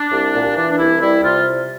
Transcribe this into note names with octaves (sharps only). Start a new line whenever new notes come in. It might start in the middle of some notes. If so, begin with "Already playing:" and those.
Already playing: D4
C2
A#2
E3 D4
D4
C2 E4
G3 E4
C3 F4